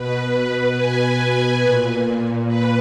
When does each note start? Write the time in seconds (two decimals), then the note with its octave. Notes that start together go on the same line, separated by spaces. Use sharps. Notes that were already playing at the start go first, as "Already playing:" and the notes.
Already playing: B2 B4
0.35 B4
0.77 G#5
1.05 B4
1.34 B4
1.62 A#2
2.47 B4